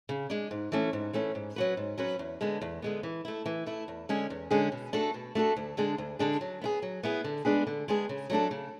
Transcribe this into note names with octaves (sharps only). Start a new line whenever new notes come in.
C#3
G#3 D4
G#2
E3 A3 C#4
G#2
E3 A3 C#4
G#2
F#3 C#4 F#4 B4
G#2
F#3 C#4 F#4 B4
E2
D3 G#3 B3
E2
D3 G#3 B3
E3
A3 E4
E3
A3 E4
E2
D3 G#3 C#4 G#4
E2
D3 G#3 C#4 G#4
B2
A3 D4 F#4 A4
B2
A3 D4 F#4 A4
D2
D3 G#3 D4 G#4
D2
D3 G#3 D4 G#4
F#3
B3 E4 G#4
F#3
B3 E4 G#4
D3
G#3 B3 D4 G#4
D3
G#3 B3 D4 G#4
C#3
F#3 A3 D4 A4
C#3